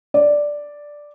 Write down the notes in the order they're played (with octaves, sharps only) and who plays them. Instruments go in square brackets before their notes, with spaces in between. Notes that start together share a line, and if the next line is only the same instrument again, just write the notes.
[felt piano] D5